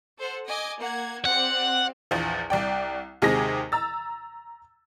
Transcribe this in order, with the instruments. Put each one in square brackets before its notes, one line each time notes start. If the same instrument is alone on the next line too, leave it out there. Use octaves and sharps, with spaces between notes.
[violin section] A4 C5 F#5
D#5 G#5 D6
A#3 F#5 G#6
[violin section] C4 G4 D5 [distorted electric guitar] F#5
[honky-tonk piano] A#1 E2 F3
C2 D5 G5
D#2 C3 G#3 G#4 D#6 A#6
A#5 E6 A6